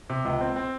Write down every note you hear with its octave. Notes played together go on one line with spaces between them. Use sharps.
C3
C#2
C4
C4